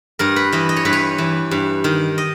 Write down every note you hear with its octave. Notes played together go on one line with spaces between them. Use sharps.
G2 A#4
B4
E3 D#5
D#5
C#5
G2 B4
C#5
E3
G2
D#3
D#5